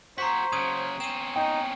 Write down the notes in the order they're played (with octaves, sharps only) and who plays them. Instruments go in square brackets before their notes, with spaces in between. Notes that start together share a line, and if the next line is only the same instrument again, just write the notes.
[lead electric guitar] F#4 G#4 [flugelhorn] C5 [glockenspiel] A#5 C#6 B6
[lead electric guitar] C#3 F#3 [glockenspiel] D#6 G#6 D#7
[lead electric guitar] C4 C#4 [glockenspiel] D#7 E7
[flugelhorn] D#4 [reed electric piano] G5